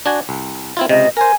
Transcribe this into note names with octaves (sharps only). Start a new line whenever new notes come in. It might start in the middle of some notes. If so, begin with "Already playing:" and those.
D4 F#4 G#5
C2
C4 E4 F4
C#2 C3 D#5
A#4 C5 G#5